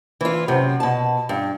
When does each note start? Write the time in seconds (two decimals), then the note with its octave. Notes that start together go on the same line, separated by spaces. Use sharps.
0.21 E3 F4
0.48 F#2 C3
0.80 B2 A5
1.29 G2